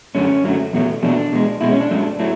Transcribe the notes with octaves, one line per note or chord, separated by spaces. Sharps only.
F#2 D3 F#3 A3 C#4
F#2 D3 F#3 A3
E2 B2 F#3 A3
E2 B2 F#3 A3 D4
B2 G#3
B2 G#3 E4
C#4
D4
G#2 F#3 A3
F#3 A3 E4